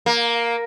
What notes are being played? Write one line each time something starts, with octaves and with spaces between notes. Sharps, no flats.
A#3